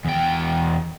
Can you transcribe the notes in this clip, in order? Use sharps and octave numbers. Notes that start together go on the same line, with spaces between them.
E2 G5